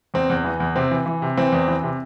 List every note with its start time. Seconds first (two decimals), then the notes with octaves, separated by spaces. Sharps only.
0.14 E2 C4
0.30 E2
0.44 E3
0.60 E2
0.76 C3 C4
0.91 E3
1.06 E3
1.22 C3
1.37 E3 C4
1.52 E2
1.68 E3
1.83 C3